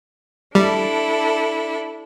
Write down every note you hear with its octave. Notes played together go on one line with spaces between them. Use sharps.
G3 D4 E4 A4